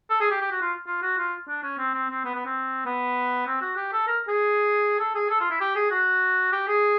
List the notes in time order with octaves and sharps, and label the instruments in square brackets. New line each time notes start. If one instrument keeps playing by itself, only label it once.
[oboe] A4
G#4
G4
G4
F#4
F4
F4
F#4
F4
D4
C#4
C4
C4
C4
B3
B3
C4
B3
C4
F#4
G4
A4
A#4
G#4
A4
G#4
A4
F4
E4
G4
G#4
F#4
G4
G#4